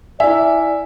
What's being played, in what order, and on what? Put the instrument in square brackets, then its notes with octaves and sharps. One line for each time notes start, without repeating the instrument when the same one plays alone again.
[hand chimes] E4 G#5 [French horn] D5 [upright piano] E5